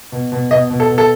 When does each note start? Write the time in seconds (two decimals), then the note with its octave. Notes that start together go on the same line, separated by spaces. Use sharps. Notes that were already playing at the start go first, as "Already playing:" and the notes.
0.12 B2
0.32 B2
0.51 B2 D#5
0.70 B2
0.80 A4
0.89 B2
0.98 A4